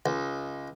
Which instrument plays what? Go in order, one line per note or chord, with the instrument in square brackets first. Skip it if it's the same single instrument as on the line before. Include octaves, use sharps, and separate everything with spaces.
[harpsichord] C#2